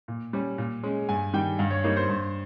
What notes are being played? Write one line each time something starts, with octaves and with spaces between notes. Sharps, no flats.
A#2
G3 C#4
A#2
G#3 C#4
G2 G#5
D#3 G3 G5
G2 F5
C#5
G3 A#3 D#4 C#5
C5
G2